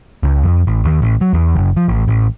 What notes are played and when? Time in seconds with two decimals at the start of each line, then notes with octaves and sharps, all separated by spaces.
0.23 C#2
0.43 F2
0.67 A1
0.85 D#2
1.02 A1
1.21 F#3
1.33 E2
1.56 F#1
1.77 F3
1.89 A1
2.08 A1